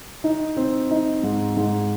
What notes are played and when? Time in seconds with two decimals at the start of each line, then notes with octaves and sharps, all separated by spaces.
0.24 D#4
0.57 C4
0.91 D#4
1.23 G#2
1.57 G#2